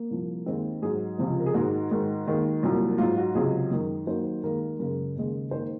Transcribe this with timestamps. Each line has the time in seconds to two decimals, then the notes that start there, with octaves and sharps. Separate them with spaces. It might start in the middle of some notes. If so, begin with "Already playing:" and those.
Already playing: A#3
0.10 C2 A#2 F3
0.46 D#2 D#3 G#3 C4
0.82 G#2 F#3 G#4
1.18 C#2 C3 F3 G#3
1.39 A#4
1.46 G#4
1.54 G#2 D#3 G#3 F#4
1.91 G#2 D#3 G#3
2.27 D#2 D#3 G#3
2.63 C2 A#2 F#3
2.98 G#2 F#3 F4
3.17 F#4
3.35 C#2 C3 F#3 G#4
3.71 F#2 D#3 G#3
4.07 D#2 D#3 F#3 C5
4.43 D#2 D#3 G#3 A#4
4.79 F#2 C#3 G#3 A#4
5.16 D#2 C#3 G#3
5.51 D#2 D#3 G#3 C5